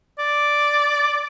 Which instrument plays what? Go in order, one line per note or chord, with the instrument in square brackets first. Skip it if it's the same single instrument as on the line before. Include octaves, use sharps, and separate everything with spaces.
[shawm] D5